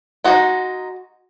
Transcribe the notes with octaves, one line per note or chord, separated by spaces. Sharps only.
G#3 D#4 F#4